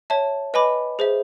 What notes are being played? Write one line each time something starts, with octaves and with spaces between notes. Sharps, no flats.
C#5 E5 A5
B4 D#5 G#5 B5 D6
G#4 C5 E5